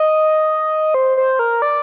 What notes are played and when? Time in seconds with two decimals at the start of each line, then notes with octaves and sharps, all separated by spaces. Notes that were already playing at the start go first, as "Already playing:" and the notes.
Already playing: D#5
0.94 C5
1.17 C5
1.39 A#4
1.62 D5